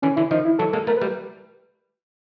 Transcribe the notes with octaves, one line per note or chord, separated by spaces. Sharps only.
D3 E3 C#4
D3 E3 E4
D#3 F3 D#4
E4
E3 F#3 A4
G#3 A#3 A4
A3 B3 A#4
B4
G3 A3